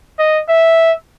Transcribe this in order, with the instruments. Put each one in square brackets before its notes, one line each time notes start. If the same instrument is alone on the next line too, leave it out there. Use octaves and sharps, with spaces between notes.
[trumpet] D#5
E5